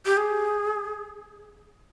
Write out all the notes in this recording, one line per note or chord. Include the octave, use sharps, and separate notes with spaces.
G4
G#4